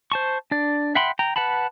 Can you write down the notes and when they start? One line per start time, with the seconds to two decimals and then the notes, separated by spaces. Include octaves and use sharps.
0.12 C5 A5 C#6
0.51 D4 D5
0.95 E5 F#5 G5 B5 C6
1.19 G5 A#5
1.36 B4 F#5 A5 B5